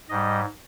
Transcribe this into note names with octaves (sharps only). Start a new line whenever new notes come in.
G#2 G3 D#5